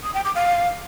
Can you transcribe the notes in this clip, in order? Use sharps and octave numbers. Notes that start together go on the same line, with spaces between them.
D#6
G5
D6
F5